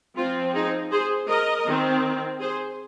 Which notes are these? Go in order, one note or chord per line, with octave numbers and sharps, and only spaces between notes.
F3 C4 F4
D#4 G#4
G#4 C5
A#4 D#5
D#3 C4
G#4 C5